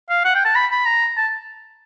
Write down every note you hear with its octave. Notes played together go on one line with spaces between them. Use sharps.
F5
F#5
G5
A5
B5
B5
A#5
A5